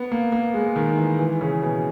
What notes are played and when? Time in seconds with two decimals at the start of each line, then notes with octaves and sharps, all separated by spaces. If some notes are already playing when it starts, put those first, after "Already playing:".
Already playing: B3
0.12 A#3
0.32 A#3
0.54 G#3
0.76 D#3
0.98 E3
1.19 E3
1.41 C#3
1.62 B2